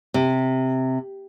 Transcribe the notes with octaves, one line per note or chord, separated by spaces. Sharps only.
C3